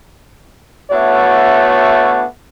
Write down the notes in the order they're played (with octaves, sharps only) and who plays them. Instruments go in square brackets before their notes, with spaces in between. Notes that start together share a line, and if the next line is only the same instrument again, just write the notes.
[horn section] A3 B3 D4 E4 F#4 C#5